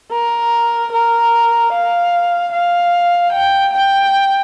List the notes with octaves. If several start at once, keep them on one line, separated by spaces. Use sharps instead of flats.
A#4
A#4
F5
F5
G5
G5